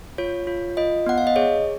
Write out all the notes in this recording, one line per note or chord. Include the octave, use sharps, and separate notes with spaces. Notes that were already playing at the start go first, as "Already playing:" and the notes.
F4 C#5
F4
F4 D#5
B3 F#5
F5
D#5
G#4 C#5